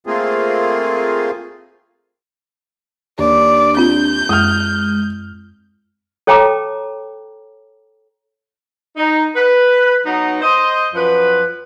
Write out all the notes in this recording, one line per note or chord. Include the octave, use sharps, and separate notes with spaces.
A3 A#3 C4 F4 G#4
D#2 D4 D5
C4 F4 G6
F#2 G#3 D#6 F6
A4 C#5 G5 A5 A#5 D6
D#4
B4
F#3 B3 D#4
C5 D#5
F#2 F3 B4